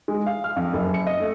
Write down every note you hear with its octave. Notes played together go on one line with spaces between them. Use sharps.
G#3
F5
F6
F2
F#1
C#7
D#5
A3